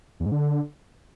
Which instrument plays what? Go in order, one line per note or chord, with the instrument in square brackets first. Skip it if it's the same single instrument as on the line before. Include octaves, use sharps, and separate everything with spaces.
[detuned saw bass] E2
G#2
D3